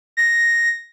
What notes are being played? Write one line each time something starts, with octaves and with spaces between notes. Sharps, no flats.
A#6